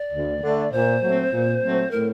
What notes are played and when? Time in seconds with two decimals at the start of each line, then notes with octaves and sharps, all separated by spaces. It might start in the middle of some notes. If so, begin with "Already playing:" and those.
Already playing: D5
0.13 D2
0.42 D3 A3 D4
0.72 A#2 C5
1.02 F#3 A3 C4
1.32 A#2
1.61 F#3 A3 C4
1.91 A2 A#4